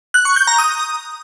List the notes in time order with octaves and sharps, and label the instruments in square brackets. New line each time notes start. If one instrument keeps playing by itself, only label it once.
[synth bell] F#6
C#6
G6
A#5
D#6